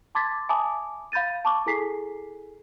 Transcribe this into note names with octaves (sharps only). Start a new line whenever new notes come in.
A5 C6 D6 G#6 A6 B6
E5 G#5 A5 B5 D6 D#6
F5 B5 G6 A6 D#7
A5 C#6 D6
E4 G#4 A4 G#5 B6 C7